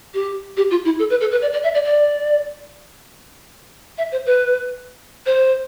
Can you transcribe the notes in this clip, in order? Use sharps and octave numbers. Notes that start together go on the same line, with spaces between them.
G4
G4
F4
E4
A4
B4
A4
B4
D5
D5
E5
D5
D5
E5
C5
B4
C5